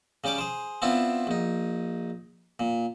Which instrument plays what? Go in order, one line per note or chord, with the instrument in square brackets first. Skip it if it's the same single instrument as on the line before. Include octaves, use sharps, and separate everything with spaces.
[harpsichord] C#3 G3 C#4 G4 D6
G#4 C5
B3 C4 D4 E4 F4
A#1 D#4
A#2